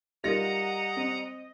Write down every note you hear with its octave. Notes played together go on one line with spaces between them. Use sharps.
G3 D#4 F4 A#4 D#5 F#5 A#5 A#6
C4